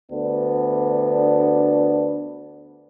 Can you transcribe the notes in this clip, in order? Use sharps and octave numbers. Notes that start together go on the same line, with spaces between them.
D2 B3 D4